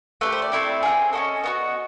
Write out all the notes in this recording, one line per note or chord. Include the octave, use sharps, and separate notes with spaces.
A3 D4 G4 B4
C5
D5
A3 C4 E4 G4
C4 F4 G#4
C#4 F#4 A4 D#5
B3 D#4 F#4